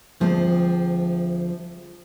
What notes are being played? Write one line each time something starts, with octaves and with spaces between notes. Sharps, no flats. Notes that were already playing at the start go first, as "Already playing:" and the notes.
D2 F3 G#3 A3 C4